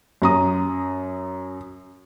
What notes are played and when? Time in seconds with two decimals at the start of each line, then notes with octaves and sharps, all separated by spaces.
0.22 F#2 A#5 D#6